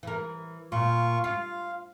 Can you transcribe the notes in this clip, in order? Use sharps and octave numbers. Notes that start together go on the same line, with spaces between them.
E3 A#4
A#2 F4 C#6
F4 F5